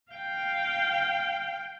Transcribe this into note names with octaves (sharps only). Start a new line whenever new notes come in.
F5 G5